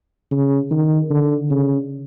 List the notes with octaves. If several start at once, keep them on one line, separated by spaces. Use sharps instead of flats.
C#3
D#3
D3
C#3